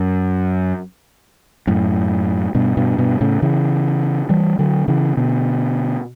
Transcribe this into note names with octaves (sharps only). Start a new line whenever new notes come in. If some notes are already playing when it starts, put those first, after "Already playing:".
Already playing: F#2
F#2 A2
G2 B2
G2 B2
G2 B2
A2 C#3
C#3 E3
E3 G3
D3 F#3
C#3 E3
B2 D3